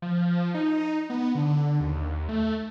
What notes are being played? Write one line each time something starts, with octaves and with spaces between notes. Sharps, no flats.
F3
D#4
B3
D3
D#2
A3